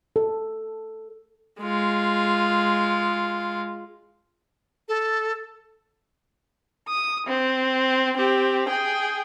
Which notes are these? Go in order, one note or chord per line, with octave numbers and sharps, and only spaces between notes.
A4
G#3 F4
A4
D#6
C4
C4 G4
G#4 G5